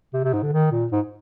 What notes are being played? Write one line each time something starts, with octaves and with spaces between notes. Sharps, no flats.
C3
C3
G#2
D3
D#3
A#2
G#2